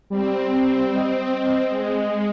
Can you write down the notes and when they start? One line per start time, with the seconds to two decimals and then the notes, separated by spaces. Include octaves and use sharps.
0.10 G3 C4
0.95 D#5
1.68 G#3